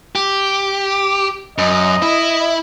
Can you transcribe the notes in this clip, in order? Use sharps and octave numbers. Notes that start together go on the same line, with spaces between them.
G4
F#2 D#5
E4